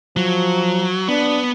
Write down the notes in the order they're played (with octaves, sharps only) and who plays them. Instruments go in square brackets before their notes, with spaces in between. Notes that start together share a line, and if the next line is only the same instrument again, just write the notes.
[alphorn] F3 [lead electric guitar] F#3
[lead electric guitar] B3 [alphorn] D4